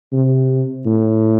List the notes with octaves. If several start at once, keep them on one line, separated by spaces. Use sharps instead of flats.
C3
A2